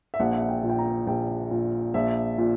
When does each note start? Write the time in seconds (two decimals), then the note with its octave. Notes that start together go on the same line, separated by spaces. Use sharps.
0.14 E5
0.20 A#1 F#5
0.33 E5
0.40 F#5
0.49 G5
0.63 A#2
0.70 G5
0.78 A#5
1.07 A#1 G5
1.51 A#2
1.94 A#1 E5
2.38 A#2